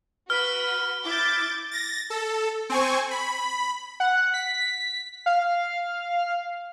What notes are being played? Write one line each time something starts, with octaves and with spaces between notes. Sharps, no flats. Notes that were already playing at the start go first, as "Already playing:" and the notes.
F#4 B4 B5 F6
E4 D6 G6 A6
A6 A#6
A4
C4 G#5 C#6
B5
F#5
B6
F5